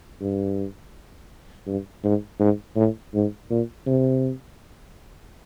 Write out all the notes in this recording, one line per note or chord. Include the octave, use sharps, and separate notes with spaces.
G2
G2
G#2
G#2
A2
G#2
A#2
C3